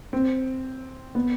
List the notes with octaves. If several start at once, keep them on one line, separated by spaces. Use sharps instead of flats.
C4
B3